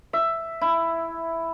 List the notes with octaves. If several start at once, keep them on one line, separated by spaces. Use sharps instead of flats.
E5
E4